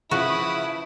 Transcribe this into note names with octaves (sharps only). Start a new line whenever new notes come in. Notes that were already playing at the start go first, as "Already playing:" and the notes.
C#3 F3 E4 F#4 B4 D#6